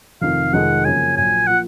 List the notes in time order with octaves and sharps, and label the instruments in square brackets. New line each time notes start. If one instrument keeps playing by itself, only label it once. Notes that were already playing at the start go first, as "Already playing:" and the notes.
[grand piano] F1 F2 D#3 [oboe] F5
[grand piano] F1 F2 D#3 G#3 D#4 [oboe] F#5
[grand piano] F#2 C#3 F3 A#3 [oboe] G#5
[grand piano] A#1 A#2 F#3 [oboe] G#5
[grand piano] F3 A#3 F4 [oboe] F#5